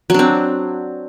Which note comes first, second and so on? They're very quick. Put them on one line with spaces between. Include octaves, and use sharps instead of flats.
F#3 D4 C4